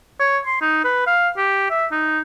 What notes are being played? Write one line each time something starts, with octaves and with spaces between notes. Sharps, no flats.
C#5
C6
D#4
B4
F5
G4
E5
D#4